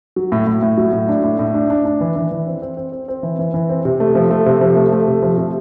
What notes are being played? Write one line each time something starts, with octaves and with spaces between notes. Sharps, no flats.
F#3
A2
A2
A2
F#3
A2
D4
A2
A2
D4
D4
D4
E3
E3
E3
C4
C4
C4
C4
C4
E3
E3
E3
C4
C3
A3
F3
A3
C3
F3
A3
A3
C3
F3
C3